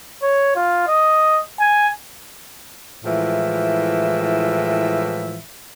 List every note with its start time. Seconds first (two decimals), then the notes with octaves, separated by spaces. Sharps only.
0.23 C#5
0.55 F4
0.88 D#5
1.60 G#5
3.04 A2 E3 F3 G#3 E5